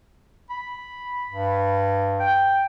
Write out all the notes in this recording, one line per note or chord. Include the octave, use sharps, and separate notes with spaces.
B5
G2
G5